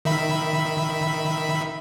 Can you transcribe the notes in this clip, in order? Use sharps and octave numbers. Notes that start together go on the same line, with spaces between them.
D#3 E5 B5